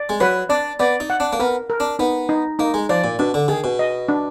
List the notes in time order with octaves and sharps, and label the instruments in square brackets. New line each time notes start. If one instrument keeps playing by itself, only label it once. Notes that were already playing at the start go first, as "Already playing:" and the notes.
Already playing: [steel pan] D5
[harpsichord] G#3
[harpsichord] F#3 [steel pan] B4
[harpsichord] D4 [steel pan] D5
[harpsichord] B3 [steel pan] D5
[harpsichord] D#4
[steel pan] F#5
[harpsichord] D4
A#3
[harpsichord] B3 [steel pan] A#4
[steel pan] A#4
[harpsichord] D4
[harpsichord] B3 [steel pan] D#4
[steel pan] D#4
[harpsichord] A#3 [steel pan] D#4
[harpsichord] G#3
[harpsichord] F3 [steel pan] D5
[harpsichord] A#2
[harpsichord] B2 [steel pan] D4
[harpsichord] D3
[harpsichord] D#3 [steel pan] G#4
[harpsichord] B2
[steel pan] D#5
D4